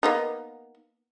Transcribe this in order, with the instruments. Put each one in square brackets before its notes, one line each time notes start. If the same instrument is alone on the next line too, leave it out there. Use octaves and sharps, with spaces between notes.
[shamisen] A#3 B3 D#4